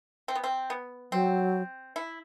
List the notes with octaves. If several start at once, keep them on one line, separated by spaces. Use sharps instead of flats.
C4
B3
C4
B3
F#3 C4
E4